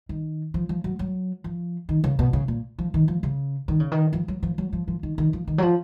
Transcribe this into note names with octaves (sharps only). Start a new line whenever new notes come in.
D#3
F3
F3
F#3
F#3
F3
D#3
C#3
B2
C#3
A#2
F3
D#3
F3
C#3
D#3
C#3
D#3
F3
F#3
F3
F#3
F3
F3
D#3
D#3
F3
D#3
F#3
F3